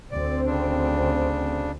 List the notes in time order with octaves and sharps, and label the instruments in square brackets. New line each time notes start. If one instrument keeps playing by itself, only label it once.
[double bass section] D2 C4 [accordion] D5
[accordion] C#3 D4